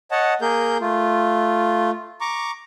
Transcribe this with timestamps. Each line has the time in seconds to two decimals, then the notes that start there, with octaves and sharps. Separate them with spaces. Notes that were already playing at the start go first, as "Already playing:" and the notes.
0.11 C#5 D#5 F#5 A5
0.41 A#3 G#4 A#4 G6
0.81 A3 F4
2.21 A#5 C#6 D6